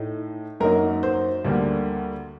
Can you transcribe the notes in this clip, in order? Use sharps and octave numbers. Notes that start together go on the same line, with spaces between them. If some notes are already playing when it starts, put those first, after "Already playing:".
Already playing: A2 A3 D#4
F#2 F#3 A#3 D#4 A#4
C5
D2 D3 G3 A#3